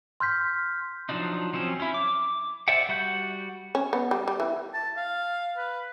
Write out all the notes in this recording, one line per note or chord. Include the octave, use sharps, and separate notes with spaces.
C6 F6 G6 B6
F3 F#3 D4 D#4
F3 F#3 C4 C#4
C#4 E4
D6
C5 D5 E5 F#5 G5
G3 F#4 F#5 G6
C#4
B3
G3
G3
E3
A5
F5
B4